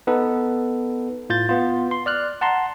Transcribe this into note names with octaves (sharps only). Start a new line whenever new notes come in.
B3 D#4 A4 B4
A2 F4 G6 A6
B3 F4
C6
D5 F6 F#6
F#5 A5 A#5 C6